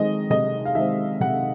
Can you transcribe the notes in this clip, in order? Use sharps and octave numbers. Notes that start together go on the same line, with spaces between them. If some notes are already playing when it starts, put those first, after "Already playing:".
Already playing: D#3 G#3 C4 D#5
C3 D#5
F5
D#3 G#3 C4 E5
C3 F#5